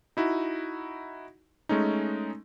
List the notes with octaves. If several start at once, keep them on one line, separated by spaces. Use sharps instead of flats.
D#4 E4 F#4
G#3 A3 C#4 D#4